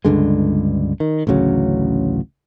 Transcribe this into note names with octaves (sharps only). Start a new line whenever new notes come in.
C#2 G2 D3 G#3
D#3
A1 D2 C#3 F#3